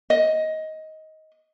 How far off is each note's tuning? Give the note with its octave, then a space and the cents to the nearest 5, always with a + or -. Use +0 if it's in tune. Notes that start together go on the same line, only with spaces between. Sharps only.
D#5 +15